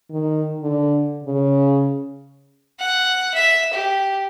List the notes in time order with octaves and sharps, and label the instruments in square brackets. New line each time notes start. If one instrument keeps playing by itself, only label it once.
[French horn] D#3
D3
C#3
[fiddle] F#5
E5
G4